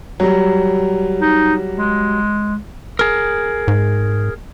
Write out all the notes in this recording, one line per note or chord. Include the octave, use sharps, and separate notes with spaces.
F#3 G3
D#4
G#3
G#4 A#4
G#2